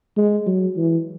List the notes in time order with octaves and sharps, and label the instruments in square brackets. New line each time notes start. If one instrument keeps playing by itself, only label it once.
[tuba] G#3
F#3
E3